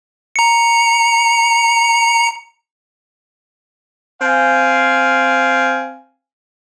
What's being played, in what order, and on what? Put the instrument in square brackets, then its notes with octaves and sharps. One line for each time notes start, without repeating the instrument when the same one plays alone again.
[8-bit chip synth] A#5 C#7
[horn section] C4 F5 G#5